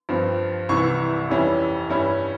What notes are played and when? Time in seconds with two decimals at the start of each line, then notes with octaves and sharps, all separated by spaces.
0.09 G2 F3 C4
0.69 C2 C3 E3 C#6
1.29 F2 E3 G3 C#4 E4
1.90 G2 G3 C#4 E4